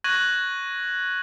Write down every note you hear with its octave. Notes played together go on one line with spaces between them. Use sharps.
C#6 F#6 G#6 A#6 D#7 F#7